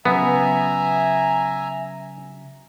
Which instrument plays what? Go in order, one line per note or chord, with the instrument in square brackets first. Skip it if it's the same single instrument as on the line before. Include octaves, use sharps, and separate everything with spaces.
[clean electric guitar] C#3 F#3 [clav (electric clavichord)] B3 [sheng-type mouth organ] E5 G#5 A#5